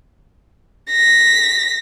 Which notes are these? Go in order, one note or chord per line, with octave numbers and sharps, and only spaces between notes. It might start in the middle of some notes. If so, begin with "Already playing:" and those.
A#6 B6